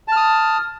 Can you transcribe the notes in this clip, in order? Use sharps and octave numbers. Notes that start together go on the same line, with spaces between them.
A5 D#6 F6